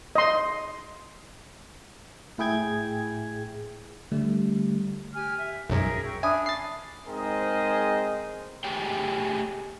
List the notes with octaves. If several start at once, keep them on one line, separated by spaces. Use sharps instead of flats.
D#5 C6
A2 E4 G#4 G5 G#6
D3 G3 A3 G4
G4 G#5 F6
E5
B1 F#2 G#4 A#4 E5
G5 C#6 E6
C#4 D4 E5 G#5 B5 D#6
A6 C7
G#2 C4 G#4 A#4 C5 D#5
A3 G4 G#4 C#5 G5